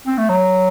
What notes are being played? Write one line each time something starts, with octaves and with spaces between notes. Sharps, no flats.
C4
A3
F#3